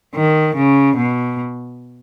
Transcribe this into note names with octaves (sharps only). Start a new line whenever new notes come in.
D#3
C#3
B2